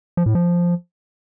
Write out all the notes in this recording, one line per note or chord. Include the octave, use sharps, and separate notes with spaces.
F3
A2
F3